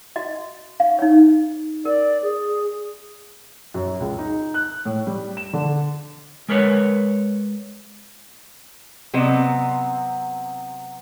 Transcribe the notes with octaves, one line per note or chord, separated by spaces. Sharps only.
F#4 D#5
F5
D#4 C#5
A#4 D5
G#4
F#2
C#2
D#4
F#6
A2
G3
E7
D3
G#3 A#4 B4 C#5
C3 F#3 B3 C4 D#5